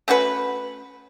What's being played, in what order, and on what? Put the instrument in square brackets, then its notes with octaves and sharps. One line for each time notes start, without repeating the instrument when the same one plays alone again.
[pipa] A3 C#4 F#4 B4